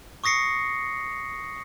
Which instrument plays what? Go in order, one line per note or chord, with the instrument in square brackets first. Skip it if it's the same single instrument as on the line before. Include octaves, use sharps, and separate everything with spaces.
[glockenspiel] C#6 D#6 A#6 C7 C#7